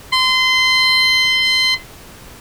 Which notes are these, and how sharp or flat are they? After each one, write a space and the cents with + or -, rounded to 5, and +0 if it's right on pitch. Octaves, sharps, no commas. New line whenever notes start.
C6 -25